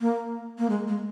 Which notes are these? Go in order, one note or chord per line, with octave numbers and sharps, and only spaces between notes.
A#3
A#3
G#3
G#3